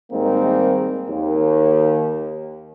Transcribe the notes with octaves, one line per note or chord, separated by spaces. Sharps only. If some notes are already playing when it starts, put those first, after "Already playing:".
G#2 D#3 G3 G#3 A#3 C4
D#2